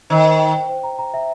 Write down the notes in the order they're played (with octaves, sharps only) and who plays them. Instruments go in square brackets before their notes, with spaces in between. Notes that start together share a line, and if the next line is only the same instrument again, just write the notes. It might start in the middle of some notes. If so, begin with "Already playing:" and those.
[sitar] D#3 [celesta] C5
[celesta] C5
G5
G5
C5
A#5
A#5
E5